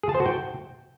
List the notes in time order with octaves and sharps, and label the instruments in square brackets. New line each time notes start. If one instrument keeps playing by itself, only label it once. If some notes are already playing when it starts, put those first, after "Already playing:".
[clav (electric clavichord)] G#4
A5
C5
F#4
G5